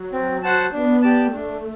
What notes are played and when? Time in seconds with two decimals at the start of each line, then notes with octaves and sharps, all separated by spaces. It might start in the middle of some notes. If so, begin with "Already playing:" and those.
Already playing: F#3
0.13 C4
0.43 F#4 C5 F#5 A5
0.73 B3 D4
1.02 G4 D5 A5
1.33 A3 D4